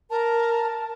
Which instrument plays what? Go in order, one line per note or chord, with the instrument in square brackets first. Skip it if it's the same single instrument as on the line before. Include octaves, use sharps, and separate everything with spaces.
[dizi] A#4 [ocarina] A5